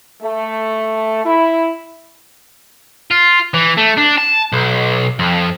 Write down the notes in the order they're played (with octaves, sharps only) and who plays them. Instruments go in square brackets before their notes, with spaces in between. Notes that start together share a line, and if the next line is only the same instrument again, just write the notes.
[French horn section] A3
E4
[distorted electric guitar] F4
E3
A3
D4
A5
B1
F2